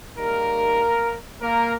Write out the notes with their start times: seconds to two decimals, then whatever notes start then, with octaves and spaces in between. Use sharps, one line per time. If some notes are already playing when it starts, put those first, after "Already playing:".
0.17 G#2 D#3 G3 A#3 A#4
1.41 A#3 A#4